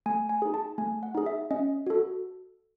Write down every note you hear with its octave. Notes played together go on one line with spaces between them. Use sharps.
A3 G#5
G#5
D#4 G#4
A5
A3 G#5
F#5
D#4 G#4
E5
C#4 D#5
F#4 A4